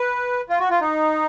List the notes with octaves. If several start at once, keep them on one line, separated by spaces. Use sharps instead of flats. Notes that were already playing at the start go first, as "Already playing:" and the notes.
Already playing: B4
F4
F#4
F4
D#4